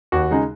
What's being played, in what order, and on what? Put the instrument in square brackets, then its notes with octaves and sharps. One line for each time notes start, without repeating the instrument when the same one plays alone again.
[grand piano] D#2 F#4
C#3 G#3 D#4